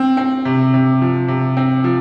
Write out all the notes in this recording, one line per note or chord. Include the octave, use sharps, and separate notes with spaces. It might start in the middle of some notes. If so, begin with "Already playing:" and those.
Already playing: C4
C4
C3
C3
F3
C3
C4
F3